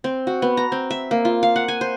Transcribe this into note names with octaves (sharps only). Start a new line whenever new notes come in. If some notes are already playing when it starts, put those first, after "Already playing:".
C4
F#4
B3
A#5
C4
E5
A#3
F4
F5
F#5
G#5
C5